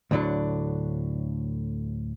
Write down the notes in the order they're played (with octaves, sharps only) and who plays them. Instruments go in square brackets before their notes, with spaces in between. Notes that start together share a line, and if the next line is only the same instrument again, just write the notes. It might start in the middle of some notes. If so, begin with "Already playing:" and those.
[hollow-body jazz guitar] D2 A2 D3 F#3 D4